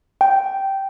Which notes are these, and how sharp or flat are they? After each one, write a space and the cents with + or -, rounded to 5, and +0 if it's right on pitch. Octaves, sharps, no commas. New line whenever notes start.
G5 -10